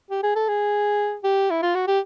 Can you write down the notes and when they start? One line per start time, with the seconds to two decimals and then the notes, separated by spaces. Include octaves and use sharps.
0.11 G4
0.23 G#4
0.36 A4
0.48 G#4
1.24 G4
1.50 E4
1.62 F4
1.75 F#4
1.87 G4